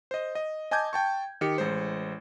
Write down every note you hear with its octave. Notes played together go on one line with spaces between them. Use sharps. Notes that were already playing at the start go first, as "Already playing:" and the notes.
C5 D#5
D#5
D#5 G#5 A5 D6 G6 G#6
G5 A5 C#6
D#3 G4 C#7
A1 G#3 C5